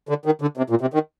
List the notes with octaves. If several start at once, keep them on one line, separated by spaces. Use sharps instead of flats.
D3
D#3
D3
C3
A#2
C3
D#3